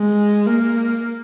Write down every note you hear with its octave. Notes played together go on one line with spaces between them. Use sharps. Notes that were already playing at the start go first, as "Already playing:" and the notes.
Already playing: G#3
A#3